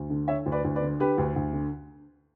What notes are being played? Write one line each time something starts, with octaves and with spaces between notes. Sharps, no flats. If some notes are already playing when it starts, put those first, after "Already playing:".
Already playing: D2
D3
D3 C#5 E5
D2
B4 D5
D2
B4 D5
D3
D3 G4 B4
D2
D2
D3